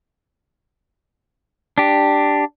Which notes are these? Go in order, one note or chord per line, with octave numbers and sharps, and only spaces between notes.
D4 G4